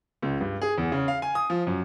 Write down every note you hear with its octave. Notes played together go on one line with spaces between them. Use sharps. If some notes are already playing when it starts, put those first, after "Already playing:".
C#2
G2
G#4
E2
C#3
F5
G#5
D#6
F3
F#2